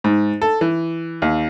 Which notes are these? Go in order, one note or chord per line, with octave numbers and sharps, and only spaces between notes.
G#2
A4
E3
D#2